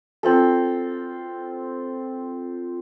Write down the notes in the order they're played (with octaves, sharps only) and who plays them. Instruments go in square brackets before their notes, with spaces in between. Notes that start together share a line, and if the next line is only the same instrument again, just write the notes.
[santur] C4 F4 A4